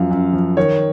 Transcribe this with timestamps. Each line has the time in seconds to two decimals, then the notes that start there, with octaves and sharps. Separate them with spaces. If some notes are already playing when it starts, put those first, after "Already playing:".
Already playing: F#2 F3 F#3 F5
0.11 F#2
0.33 F3
0.57 D#3 C#5